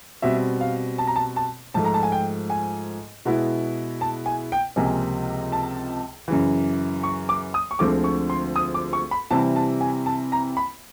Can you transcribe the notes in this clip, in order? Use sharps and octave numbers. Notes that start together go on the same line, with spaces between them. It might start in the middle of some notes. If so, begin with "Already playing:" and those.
B2 G3 C4 E5
F5
A5
A#5
A5
A5
G#2 F3 A3 A5
A#5
A5
G#5
G5
G#5
B2 G#3 B3 E4
A5
G#5
G5
C#2 C3 F3 A#3 G#5
A5
F#2 C#3 E3
C#6
D6
D#6
C#6
D2 D3 F3 G#3 C4 D6
C#6
C6
D#6
D6
C#6
B5
C3 E3 G3 C4 E4 A5
A5
G#5
A5
A#5
B5